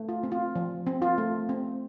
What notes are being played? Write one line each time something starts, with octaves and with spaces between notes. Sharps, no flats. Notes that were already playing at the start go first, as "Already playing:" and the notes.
Already playing: A3
F4
C4
F4
F3
C4
F4
A3
C4